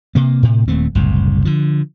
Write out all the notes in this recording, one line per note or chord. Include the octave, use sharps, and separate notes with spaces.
C3 A#3
A2 C3
D#1 D#2 A3 C4
F#1 C2 A2
D3 F3